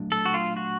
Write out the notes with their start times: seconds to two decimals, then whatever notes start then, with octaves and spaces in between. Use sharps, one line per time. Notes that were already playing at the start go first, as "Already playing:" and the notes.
Already playing: A#2 F#3 A3 D4
0.12 A4
0.26 F#4
0.34 F4
0.57 F#4